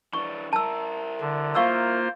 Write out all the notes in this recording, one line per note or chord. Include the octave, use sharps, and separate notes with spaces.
E3 D4 C#6
E4 A#4 A5 E6
D3
A#3 F4 C5 F5 C#6 E6